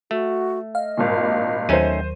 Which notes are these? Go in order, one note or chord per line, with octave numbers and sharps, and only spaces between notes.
A3 F#4
D#5 F5
G#1 G2 A#2
D#2 F#3 A3 C#4 D#4 C5 D#7